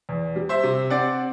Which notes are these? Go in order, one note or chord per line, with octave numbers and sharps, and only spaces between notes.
E2
G3
C5 E5
C3
C4 D5 F#5